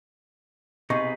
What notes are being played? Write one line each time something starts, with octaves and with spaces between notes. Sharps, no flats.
B1 C3 D#4 G#4 B4 D#5 C#6